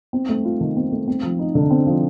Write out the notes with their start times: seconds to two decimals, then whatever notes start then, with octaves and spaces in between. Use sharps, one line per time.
0.13 C4
0.29 A3
0.45 F4
0.61 D#3
0.77 C4
0.92 A3
1.08 C4
1.23 F3
1.39 D#4
1.55 D3
1.71 C4
1.86 F3